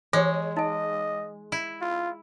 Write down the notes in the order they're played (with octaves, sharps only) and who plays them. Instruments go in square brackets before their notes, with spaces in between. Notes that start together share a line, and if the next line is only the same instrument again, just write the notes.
[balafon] E3 [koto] G#3 [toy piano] G4 C5 C#5
[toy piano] D#4 G#5 [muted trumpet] D#5
[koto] E4
[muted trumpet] F4